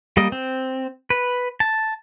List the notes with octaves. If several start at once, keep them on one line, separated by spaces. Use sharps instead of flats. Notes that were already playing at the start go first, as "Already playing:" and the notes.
G3 A#3 D#5
C4
B4
A5